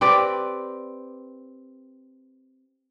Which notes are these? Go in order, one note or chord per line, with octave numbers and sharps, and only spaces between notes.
C4 G4 B4 D5